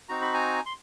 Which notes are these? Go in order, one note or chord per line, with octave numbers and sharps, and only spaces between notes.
C4 D#4 F#4 A#5
B5
G#5 A#5
C6